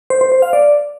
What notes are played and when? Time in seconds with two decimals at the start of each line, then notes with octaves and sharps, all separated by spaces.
0.10 C5
0.21 C5
0.32 C5
0.42 F5
0.53 D5